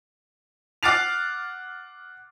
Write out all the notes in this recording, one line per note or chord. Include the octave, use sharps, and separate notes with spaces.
F#5 D6 F6 A6 C7 F7